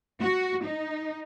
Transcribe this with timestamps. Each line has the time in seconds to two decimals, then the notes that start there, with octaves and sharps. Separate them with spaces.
0.22 F#4
0.65 D#4